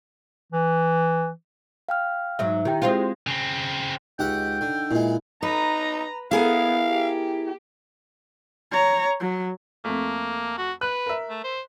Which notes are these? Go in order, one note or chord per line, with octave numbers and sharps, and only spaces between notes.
E3
F5 G5 F6
G#2 F#3 E5
D#3 E4 G4 G5
G#3 C4 F4
C#3 C4
C#2 D#4 G4 F#5 G5
D3
A#2 G#3 E4
D#4 B4 A#5
B3 E4 G#4 A#4 F5
G4
C#5 A#5
F#3
F2 A3 A#3
F#4
B4 F#6
A#4 E5
A3
C5